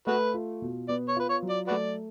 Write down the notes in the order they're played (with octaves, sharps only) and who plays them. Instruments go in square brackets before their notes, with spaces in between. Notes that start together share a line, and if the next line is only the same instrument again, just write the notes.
[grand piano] A3 [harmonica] F#4 B4
[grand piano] F4
B2
[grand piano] B3 [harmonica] D5
[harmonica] C#5
[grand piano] F4 [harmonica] B4
[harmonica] C#5
[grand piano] F#3
[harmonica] D5
[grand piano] A3 [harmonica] F#4 B4 D5